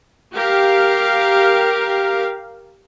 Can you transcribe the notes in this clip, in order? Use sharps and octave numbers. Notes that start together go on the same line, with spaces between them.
G4 A#4 F5